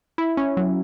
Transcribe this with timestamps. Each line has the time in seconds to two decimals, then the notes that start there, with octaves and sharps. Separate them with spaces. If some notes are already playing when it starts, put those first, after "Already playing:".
0.18 E4
0.37 C#4
0.57 F#3